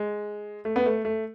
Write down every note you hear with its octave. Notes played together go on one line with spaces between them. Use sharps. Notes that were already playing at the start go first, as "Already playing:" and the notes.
Already playing: G#3
A3
B3
A3
A3